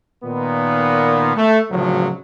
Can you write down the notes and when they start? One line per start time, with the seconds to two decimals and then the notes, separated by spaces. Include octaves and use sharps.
0.24 A#2 D#3 B3
1.35 A3
1.71 G#1 D2 A2 C#3 F3 F#3